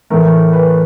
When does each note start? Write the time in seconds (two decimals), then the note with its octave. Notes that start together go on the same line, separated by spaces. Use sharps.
0.10 A2 E3 A3 A#4
0.53 B4